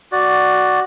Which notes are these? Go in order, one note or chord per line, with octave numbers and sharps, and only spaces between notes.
F#4 D5